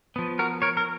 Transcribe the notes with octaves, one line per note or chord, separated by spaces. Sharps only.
F3 B3
F#4 A#4
A#4 C#5
A#4